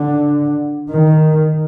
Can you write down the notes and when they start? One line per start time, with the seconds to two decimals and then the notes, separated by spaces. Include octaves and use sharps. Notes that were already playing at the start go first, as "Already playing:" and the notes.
Already playing: D3
0.90 D#3